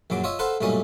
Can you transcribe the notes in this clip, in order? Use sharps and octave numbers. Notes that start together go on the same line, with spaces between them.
A#1 F#2 F#3 D6
F4 C#5 D#5 E5
A4 B4 C5 F5 F#5
B1 G2 A#2 A3 C#4 D#5